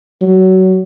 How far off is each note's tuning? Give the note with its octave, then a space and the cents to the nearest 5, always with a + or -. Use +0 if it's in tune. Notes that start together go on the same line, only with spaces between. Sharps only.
F#3 +20